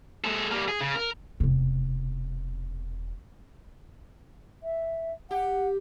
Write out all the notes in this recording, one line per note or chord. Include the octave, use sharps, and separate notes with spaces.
G#3 A4
G3 A#3
G#4
C#3
A#4
E1 C3
E5
G4 F#5